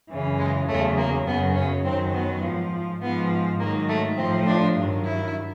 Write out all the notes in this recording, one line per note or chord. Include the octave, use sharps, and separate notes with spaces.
F#2 C#3 E3
G#3
E2 C#3 F#3 A3
A#3
F#2 C#3 F#3 B3
C#4
F#2 D#3 F#3 C4
B3
G#2 F3
G#2 F3 B3
G#2 D#3 F#3 A#3
A3
A2 F3 C4
D4
G2 D#3 F#3
E4